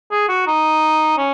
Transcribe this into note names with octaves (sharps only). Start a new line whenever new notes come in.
G#4
F#4
D#4
C#4